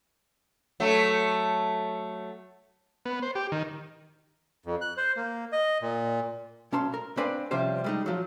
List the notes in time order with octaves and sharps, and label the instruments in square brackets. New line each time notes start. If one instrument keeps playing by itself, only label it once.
[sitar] F#3 A3
[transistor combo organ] B3
C5
G4
D#3
[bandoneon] F2
F#6
C5
A#3
D#5
A#2
[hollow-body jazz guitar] B1 C#4 A5 C6
A#4
C4 D4 B4 D5 F5 G#5
C3 F3 G3 C#4 G4 C5
G3 G#3 D#4
F3 F#3